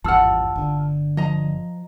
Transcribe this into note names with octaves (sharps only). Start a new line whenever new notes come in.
G#1 E2 G2 F4 F#5 A5 E6 F6
G1 D3
F3 D#5 A#5